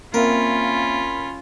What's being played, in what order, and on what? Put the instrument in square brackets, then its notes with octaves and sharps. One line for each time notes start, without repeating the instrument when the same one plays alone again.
[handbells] A#3 C4 E5 [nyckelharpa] C#4 F4 [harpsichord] A#4 [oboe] B5